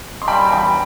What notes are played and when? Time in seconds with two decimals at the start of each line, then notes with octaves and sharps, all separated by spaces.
0.22 C6
0.28 G3 G5 B5
0.44 E2
0.52 G5 B5